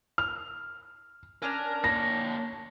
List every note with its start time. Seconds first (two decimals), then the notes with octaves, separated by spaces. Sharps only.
0.18 F6
1.42 C#4 D4 A#4 F6
1.84 A#3 C#5 A#6